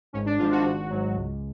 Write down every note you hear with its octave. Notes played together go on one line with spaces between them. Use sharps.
G#1 C#4
D4
G#2 F3 F4
F#4
G#1 F#4
G#2 F#3
C#2